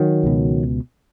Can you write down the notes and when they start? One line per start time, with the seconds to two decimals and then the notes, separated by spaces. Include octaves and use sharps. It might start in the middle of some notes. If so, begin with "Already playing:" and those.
Already playing: D#3 F#3
0.24 C#2 B2